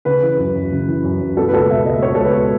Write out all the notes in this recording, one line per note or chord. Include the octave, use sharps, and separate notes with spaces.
C#3 B4
E3
F#2
F#2
C#3
E3
F#2
F#2
B2 A4
B4
C#2 A4
B2 E5
C#2 D#5
B2 C#5
C#2 A4
B4
B2